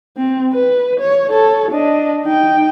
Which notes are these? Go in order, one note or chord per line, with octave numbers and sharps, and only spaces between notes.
C4
B4
C#5
A4 C#5
D4 D#5
D#4 G5